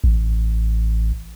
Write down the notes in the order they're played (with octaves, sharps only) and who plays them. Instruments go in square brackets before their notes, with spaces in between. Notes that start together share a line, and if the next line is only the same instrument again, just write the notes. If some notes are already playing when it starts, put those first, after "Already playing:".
[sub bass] A1